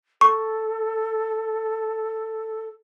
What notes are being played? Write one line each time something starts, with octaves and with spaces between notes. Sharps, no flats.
A4 C#6